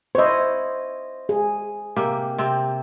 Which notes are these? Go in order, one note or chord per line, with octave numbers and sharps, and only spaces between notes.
E4 C5 C#5 D#5
G#4
C3 A#3 G4
C3 C4